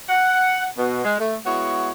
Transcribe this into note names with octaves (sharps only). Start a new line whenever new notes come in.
F#5
B2
G#3
A3
G#3 B3 E4 F#4 C#5